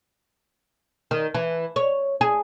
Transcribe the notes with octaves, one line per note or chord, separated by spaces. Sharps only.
D#3
E3
C#5
G#4